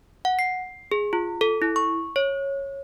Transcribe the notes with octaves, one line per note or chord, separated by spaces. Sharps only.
F#5
C7
G#4
F4
A4
E4
C#6
C#5